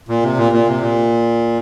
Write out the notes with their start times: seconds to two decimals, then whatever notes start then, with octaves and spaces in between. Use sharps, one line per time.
0.08 A#2
0.23 C3
0.37 A#2
0.52 A#2
0.68 C3
0.81 A#2